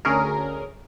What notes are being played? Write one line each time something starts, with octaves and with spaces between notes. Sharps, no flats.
D2 C#4 G#4 A#4